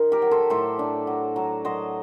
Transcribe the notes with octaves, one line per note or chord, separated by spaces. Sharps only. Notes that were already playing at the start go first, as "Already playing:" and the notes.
Already playing: D#3 C6
G4 A#4
F#3
A4 C5
A2 A4 C5
D4
F#3
F#3
F#3 C5 D#5